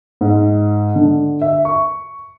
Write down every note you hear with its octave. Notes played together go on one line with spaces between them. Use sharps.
G#2
D3
E5
C#6